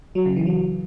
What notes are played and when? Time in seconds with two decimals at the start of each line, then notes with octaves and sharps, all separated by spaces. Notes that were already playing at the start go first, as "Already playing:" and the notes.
0.15 F#3
0.25 C#3
0.36 E3
0.46 F#3